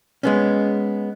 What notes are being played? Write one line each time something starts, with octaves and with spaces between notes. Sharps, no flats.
G#3 B3 C#4